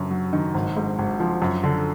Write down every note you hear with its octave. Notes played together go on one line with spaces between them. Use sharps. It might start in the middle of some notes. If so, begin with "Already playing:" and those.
Already playing: F#1 F#2
F#3
D#3
G#1
G#2
G#1
F3
F#2
D3